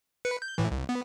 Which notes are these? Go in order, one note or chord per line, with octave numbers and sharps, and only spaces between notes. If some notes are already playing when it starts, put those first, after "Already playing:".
B4 C#7
G6
A2 E3
C2
B3